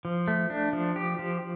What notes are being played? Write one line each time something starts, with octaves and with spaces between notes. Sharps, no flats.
F3
A3
D4
F3
G4
F3